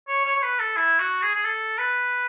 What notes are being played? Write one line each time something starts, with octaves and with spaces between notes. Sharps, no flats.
C#5
C#5
C#5
B4
A4
E4
F#4
G#4
G#4
A4
B4